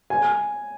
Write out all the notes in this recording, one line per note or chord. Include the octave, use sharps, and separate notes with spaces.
G#5